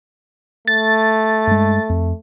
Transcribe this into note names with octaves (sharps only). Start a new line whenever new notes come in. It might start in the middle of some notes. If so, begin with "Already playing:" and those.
A3 A6
G2 G#3
F2